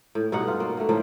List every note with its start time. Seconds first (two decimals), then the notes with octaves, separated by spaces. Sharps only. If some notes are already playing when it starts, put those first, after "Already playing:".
0.15 A2
0.32 G2 B2 D#4 F#5
0.48 F4
0.60 F#3 A#3
0.77 B2 A3
0.89 A2 F3 F#3 A#3